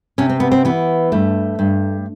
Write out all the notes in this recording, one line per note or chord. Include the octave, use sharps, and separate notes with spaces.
C3 C#4
C4
B3
C4
E3 B3
G2 A3
G2